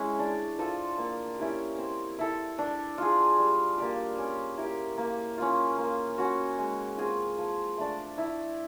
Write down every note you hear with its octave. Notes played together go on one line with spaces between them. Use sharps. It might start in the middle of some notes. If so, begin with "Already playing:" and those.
Already playing: G#3 C#4 E4
D4
F4 A4 C5
A#3
C#4 E4 G4
C4
E4 A4
D4
F4 G#4
G3
A#3 D4 G4
C#4
E4 G4 A#4
A#3
C#4 F4
A#3
C#4 F#4
G#3
C4 F4 G#4
F3
A3 D4
E4